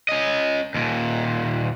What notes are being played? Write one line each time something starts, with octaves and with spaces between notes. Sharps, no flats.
C#4 D#5
D#2 A#2